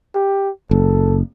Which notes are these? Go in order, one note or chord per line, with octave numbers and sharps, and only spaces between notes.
G4
F#1 A4